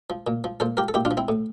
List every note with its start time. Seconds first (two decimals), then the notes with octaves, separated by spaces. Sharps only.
0.10 F3
0.27 A#2
0.44 F3
0.60 A#2 A4 C5
0.77 F3 G4 A#4
0.88 A4
0.94 A#2 E4 G4
1.05 D4 F4
1.11 F3
1.17 C4 E4
1.28 A2